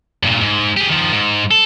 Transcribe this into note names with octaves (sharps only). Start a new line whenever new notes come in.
G2 A#2
G#2
G4 G#4
D#3 F3
G#2
A4